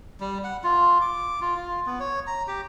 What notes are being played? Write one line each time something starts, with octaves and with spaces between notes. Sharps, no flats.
G3
F#5
F4
D6
F4
F4
B3
C#5
A#5
G4